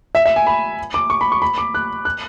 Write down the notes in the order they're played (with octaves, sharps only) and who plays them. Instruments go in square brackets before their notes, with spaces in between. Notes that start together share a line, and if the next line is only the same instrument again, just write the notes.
[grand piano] E5
E5
G#5
B5
D6
C#6
B5
C#6
B5
D6
F#6
F#6